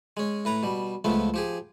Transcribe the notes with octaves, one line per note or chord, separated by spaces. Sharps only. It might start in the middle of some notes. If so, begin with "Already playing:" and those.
G#3 C#4
A2 B4 A#5
B2 G3
C#2 F3 A3 B3
F3 G4 G#4